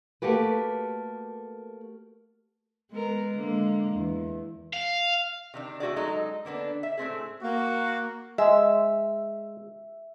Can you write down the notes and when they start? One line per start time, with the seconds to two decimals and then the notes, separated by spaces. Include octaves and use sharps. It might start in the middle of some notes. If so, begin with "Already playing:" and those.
0.22 A3 A#3 F#4 G4 B4
2.90 G#3 B3 A#4
3.35 D3 G#3 A#3
3.92 E2
4.73 F5
5.54 C3 D#3 D4
5.80 A3 F#4 G#4 D5
5.96 F#3 G#3 D#4 A4
6.45 D3 A#3 B3 D4
6.83 E5
6.97 A2 A3 C4 G#4
7.42 A#3 F#4
8.38 G#3 E5